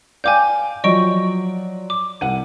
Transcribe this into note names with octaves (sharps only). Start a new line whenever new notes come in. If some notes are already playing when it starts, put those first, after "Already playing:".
D5 F5 G5 G#5 D6 G6
F3 F#3 D5 D#5 C#6 D7
D6
C2 F#5 D#7